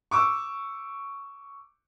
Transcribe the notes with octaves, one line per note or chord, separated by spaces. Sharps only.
C#6 D6 E6